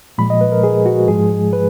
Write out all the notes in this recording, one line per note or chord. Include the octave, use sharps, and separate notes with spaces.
A#2 F3 G#3 B5
D#5
B4
A#4
G#4
F#4
G#2 F3 G#3 G#4
B4